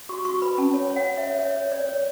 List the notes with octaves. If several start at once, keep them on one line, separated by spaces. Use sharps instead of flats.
F#4 C#6
F#4 C#6
B4 B5
C#4 A5
C#5 A5
C#5
F#5
C#5
E5
C#5
C#5 E5
C#5
C#5 D5
C#5